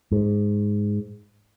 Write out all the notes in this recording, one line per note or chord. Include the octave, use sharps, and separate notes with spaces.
G#2